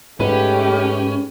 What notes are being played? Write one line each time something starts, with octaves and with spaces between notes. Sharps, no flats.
G#2 A3 C#4 G4 B4